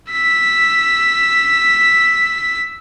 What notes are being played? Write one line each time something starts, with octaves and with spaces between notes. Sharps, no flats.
E6 B6